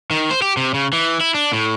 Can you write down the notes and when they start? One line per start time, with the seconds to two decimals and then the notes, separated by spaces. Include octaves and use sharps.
0.11 D#3
0.30 C5
0.42 G4
0.57 C3
0.74 C#3
0.93 E3
1.20 E4
1.34 D4
1.53 A2